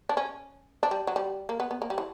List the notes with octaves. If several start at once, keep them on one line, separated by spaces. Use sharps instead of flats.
D4
C#4
D4
G3
F#3
G3
A#3
B3
B3
A#3
G3
E3